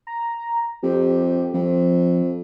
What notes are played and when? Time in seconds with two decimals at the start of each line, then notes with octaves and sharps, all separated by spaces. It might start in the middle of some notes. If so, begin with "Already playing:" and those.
0.07 A#5
0.83 F2 G4
1.54 F2 F3